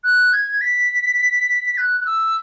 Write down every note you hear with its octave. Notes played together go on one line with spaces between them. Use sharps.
F#6
G#6
B6
F#6
F#6
E6